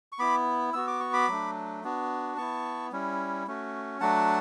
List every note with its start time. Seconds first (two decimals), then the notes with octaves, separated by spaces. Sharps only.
0.12 C#6
0.19 B3 E4 B5 D6
0.73 B3 F#4 E6
0.87 D6
1.00 C#6
1.13 B5 D6
1.28 F#3 A3 D4
1.84 B3 D4 F#4
2.37 B3 E4 A5 C#6
2.92 G3 C#4 E4
3.47 A3 C#4 F#4
4.00 F#3 A3 D4 F#4 F#5 A5